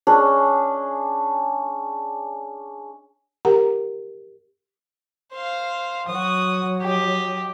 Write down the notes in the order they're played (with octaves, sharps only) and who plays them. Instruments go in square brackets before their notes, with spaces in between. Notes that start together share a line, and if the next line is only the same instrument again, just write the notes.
[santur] C#4 D4 G#4 D#5
[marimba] G4 A#4 F#5 A#5
[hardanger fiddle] C5 F5
[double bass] F#3 [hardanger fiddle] F#4 D#6
[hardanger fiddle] G4 D#5